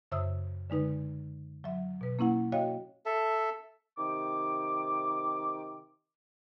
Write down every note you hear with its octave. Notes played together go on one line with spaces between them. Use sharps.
F#2 C#3 C5 E5 D#6 E6
D3 G#3 D#4 B4
F#3 E5
B2 B4
A#3 C#4 E4 F#5
F#4 C#5 D#5 F5 G5
A4 E5
C3 D#3 D6